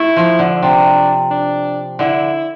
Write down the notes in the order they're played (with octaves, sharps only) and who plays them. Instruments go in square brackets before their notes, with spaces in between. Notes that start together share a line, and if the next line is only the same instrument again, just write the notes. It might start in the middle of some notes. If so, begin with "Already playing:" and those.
Already playing: [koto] A3 [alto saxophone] E4
[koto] F3
D3
[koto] C3 [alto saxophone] D4
[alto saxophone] D4
[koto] D3 [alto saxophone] E4